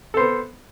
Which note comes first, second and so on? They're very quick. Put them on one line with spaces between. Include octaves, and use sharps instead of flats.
A4 C5 B3